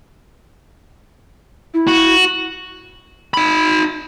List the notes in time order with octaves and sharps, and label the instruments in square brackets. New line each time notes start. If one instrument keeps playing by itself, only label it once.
[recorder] E4
[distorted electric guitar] F#4
[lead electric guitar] D#4 B5